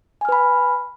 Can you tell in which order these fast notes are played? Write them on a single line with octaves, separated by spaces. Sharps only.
G#5 F6 B4 B5